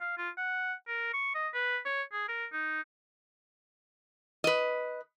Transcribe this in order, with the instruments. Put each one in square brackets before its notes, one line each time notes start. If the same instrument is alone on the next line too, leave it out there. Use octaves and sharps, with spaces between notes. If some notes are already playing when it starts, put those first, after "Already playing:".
[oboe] F5
F4
F#5
A#4
C#6
D#5
B4
C#5
G#4
A#4
D#4
[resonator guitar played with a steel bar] B4 D#5